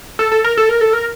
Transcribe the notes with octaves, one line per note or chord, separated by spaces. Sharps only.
A4
A4
A#4
A4
A#4
A4
A#4